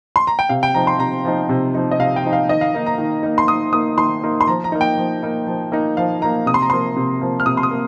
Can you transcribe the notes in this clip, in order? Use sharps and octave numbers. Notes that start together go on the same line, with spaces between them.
C6
A#5
G5
C3 F5
G5
F3 D#4 A#5
C6
C3 A#5
F3 D#4
C3
F3 D#4
D#5
C3 F5
G5
F3 D#4
F5
D#3 D#5
F5
A#3 D#4
A#5
D#3
A#3 D#4
C6
D#3 D#6
A#3 D#4 D#6
D#3 C6
A#3 D#4
C6
F3 A#5
A#5
A#3 D#4
G5
F3
A#3 D#4
F3
A#3 D#4
F3 F5
A#3 D#4 A#5
C3 D#6
C6
A#5
F3 A#3 C6
C3
F3 A#3
F6
C3 D#6
C6
D#6
A#3